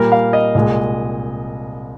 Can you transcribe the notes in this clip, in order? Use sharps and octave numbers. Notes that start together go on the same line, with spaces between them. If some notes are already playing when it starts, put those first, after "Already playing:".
Already playing: A#2 G3 A#3 A#4
F5
D#5
C2 A#2 G#3